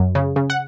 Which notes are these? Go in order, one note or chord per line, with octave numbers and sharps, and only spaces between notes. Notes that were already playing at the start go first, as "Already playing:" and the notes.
Already playing: F#2
C#3
C#3
F#5